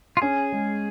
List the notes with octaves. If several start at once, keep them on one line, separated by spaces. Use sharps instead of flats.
F4
C#4 G#4
G#3